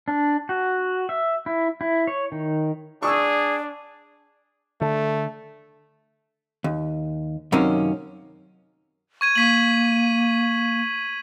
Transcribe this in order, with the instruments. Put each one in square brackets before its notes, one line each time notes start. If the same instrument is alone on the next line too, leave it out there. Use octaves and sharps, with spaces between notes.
[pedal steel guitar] D4
F#4
E5
E4
E4
C#5
D#3
[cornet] D4 [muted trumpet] G#4 [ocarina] D5 [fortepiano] C#6 D#6 E6
[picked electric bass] D3 [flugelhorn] A3
[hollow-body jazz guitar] D#2
F#2 C3 D#3 A#3 C#4
[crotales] C#6 G#6 D#7
[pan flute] A#3 [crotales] C#6 B6 F#7